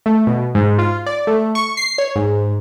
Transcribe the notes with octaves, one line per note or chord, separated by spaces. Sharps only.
A3
B2
G#2
F4
D5
A3
C#6
C7
C#5
G#2